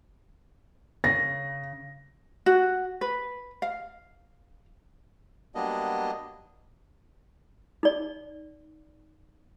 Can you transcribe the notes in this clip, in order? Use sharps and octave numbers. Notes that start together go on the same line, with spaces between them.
C#3 A#6
F#4
B4
F5
F#3 G3 A#3 B3 D4 D#5
D#4 D5